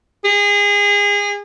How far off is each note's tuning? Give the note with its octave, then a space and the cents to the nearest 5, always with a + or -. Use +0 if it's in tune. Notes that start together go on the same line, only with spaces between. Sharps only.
G#4 -30